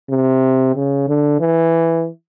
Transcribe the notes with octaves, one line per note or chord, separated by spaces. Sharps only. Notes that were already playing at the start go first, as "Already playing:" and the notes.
C3
C#3
D3
E3